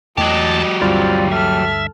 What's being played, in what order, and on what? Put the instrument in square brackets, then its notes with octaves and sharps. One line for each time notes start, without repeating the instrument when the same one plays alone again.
[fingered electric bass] E2 E3 A3 [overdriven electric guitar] F#3 G4 [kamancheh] D#5 [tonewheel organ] A5
[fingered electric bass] D2 G2 [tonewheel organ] G3 F4 [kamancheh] C4
[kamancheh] A4 F6 [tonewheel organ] E5